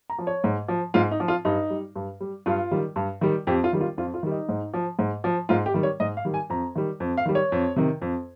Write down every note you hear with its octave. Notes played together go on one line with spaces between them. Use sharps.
A#5
F3
C#5
G#2
F3
G#2 F4
D#4
F3
F4
G2 D#4
G3
G2
G3
G2 F4
D#3 G3
G2
D#3 G3
F2 G4
F4
D#3 G3
F4
F2 F4
F4
D#3 G3
D#4
G#2
F3
G#2
F3
G#2 F4
G4
D#3 G3
C#5
G#2 D#5
F5
D#3 G3
G#5
F2 A#5
D#3 G3
F2
F5
D#3 G3
C#5
F2
C3 D#3
F2